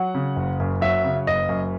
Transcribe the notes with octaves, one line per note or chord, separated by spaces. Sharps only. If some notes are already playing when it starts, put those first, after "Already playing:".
Already playing: F#3 F#5
C#3
F#1
F#2
F#3 E5
C#3
F#1 D#5
F#2